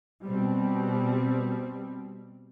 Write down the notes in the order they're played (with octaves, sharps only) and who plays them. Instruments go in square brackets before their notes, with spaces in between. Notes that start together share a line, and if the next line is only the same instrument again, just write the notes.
[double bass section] B2 G3 C4